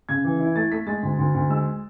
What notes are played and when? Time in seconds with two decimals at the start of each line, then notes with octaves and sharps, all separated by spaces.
0.09 C#3 G#6
0.25 E3
0.40 E4
0.56 A3 A6
0.72 A3 B6
0.87 G#3 A6
1.03 D2
1.19 D2
1.34 D2
1.49 G#3 E6